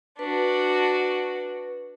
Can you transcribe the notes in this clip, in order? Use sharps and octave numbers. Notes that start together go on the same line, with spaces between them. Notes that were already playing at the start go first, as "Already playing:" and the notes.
D4 F#4 B4